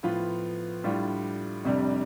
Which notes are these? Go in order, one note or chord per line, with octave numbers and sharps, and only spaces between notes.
A2 F3 B3 F4 B4
A2 G3 D4 F4
F1 F2 C3 G3 D4 D5